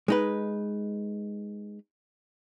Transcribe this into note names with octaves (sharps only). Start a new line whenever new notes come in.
G#3 D#4 B4